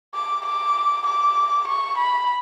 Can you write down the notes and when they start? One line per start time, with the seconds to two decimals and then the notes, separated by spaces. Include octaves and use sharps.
0.15 D6
0.46 D6
1.07 D6
1.68 C#6
1.98 B5